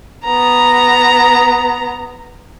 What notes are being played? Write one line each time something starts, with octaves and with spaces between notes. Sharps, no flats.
B3 A#5